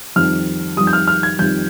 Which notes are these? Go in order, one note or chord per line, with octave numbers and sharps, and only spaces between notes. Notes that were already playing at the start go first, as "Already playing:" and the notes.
F2 D#3 G3 F6
F2 D#3 G3 D#6
G6
F6
F6
G#6
F2 D#3 G3 G6